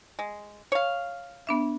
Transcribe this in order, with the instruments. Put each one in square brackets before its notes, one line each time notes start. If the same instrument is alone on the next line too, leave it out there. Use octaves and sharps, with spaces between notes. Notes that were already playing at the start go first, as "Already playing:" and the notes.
[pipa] G#3
C#5 F5
[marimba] B3 D4 E5